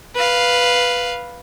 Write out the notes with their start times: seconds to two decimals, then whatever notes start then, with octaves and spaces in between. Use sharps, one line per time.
0.15 B4 F5